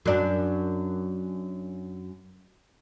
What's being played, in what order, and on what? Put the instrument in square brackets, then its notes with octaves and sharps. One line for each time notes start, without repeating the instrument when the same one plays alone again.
[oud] F#2 D4